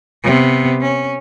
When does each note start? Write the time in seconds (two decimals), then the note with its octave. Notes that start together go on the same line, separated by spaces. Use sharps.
0.24 C3 B3
0.81 C#4